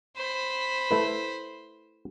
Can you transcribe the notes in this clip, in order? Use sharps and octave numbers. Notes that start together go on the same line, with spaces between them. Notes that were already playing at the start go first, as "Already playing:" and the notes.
C5 B5
A3 E4 B4